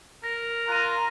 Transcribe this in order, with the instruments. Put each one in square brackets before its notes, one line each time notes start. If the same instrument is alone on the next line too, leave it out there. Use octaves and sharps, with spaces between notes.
[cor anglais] A#4 [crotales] A#6
[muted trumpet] F4 [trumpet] A#5 [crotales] F#6 D#7